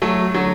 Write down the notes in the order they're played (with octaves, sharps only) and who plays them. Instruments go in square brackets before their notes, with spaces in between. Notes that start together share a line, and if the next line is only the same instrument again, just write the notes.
[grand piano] F#3 A3
D3 F#3